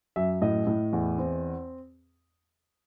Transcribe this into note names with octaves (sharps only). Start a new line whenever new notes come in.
F#2 E5
A2 D#5
A2
E2
C4